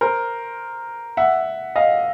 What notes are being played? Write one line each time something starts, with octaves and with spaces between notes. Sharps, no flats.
A#4 C5
E5 F#5
D#5 F5